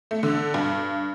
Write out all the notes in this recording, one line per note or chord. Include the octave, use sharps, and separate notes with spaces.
A3
D3
G2